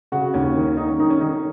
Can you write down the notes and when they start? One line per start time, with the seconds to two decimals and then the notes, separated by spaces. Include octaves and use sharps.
0.12 C#3 F#4
0.34 D#2 C#4
0.56 D#3
0.77 D#3 D#4
0.89 C#4
0.99 D#3 D#4
1.10 C#4
1.21 D#3 D#4